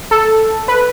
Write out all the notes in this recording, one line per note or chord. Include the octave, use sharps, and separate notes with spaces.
A4
B4